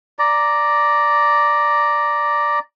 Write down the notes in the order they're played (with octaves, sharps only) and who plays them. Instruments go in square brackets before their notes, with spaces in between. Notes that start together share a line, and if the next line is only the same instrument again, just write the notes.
[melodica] D5 A#5